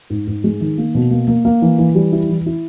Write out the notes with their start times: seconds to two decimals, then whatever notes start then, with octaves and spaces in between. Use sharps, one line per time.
0.10 G#2
0.27 G#2
0.44 G#3
0.61 D#3
0.78 A#3
0.95 B2
1.11 A#3
1.28 A#3
1.45 A#3
1.62 E3
1.78 E3
1.95 G3
2.12 E4
2.29 E3
2.46 E4